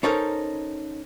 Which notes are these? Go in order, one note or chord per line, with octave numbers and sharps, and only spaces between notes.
C#4 D#4 A4 A#4 C5